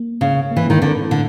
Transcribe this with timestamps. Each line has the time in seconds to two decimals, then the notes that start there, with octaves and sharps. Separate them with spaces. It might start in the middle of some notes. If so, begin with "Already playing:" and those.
Already playing: A#3
0.21 C#3 C#4
0.51 A#3
0.56 E3
0.70 D#3
0.82 D3 C4
1.11 A2 D3